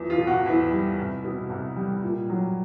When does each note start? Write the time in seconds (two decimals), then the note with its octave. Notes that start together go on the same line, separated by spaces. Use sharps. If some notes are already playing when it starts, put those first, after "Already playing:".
Already playing: E2 F3
0.10 F4
0.18 B2
0.27 F#4
0.45 E2 E4
0.71 G3
0.97 C2
1.24 B2
1.49 C2
1.76 G3
2.02 A#2
2.30 F#3